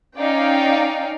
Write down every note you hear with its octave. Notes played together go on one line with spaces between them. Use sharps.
C#4 D#4 D5 F5 G5